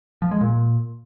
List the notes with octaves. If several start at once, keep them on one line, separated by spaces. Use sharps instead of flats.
F3
G#3
A#2